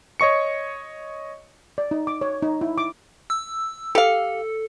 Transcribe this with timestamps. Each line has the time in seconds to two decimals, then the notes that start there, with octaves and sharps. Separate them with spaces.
0.20 C#5 D#5 C#6 C#7
1.78 D5
1.91 D#4
2.07 D6
2.21 C#5
2.42 D#4
2.61 E4
2.78 D6
3.30 E6
3.95 G4 A4 F5